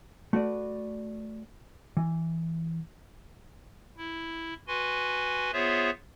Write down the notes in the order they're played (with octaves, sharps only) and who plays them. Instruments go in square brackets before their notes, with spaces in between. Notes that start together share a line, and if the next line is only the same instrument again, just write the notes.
[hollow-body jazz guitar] A3 F#4 B4 D5
E3
[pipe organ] E4
F#4 B4 G#5 C6
B3 F4 G#4 C5 C#5 E5